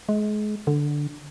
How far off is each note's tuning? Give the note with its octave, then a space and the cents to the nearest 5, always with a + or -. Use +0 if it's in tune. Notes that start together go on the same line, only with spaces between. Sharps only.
G#3 +30
D3 +0